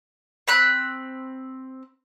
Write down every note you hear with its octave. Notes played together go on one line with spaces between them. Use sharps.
C4 B5 F#6